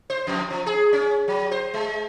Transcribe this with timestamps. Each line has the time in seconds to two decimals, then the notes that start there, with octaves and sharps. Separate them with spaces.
0.10 C5
0.27 F2
0.50 F3
0.66 G#4
0.93 C#4
1.28 F#3
1.51 C5
1.74 G#3